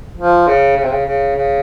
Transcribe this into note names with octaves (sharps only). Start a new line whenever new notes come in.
F3
C#3
C#3
C3
C#3
C#3
C#3